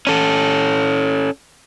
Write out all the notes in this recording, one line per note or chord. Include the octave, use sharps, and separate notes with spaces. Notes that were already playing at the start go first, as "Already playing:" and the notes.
C#4 A4